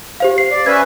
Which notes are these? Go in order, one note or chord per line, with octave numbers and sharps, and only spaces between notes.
G4 C5 F5
C7
D5
C#4 B4 E5 G#6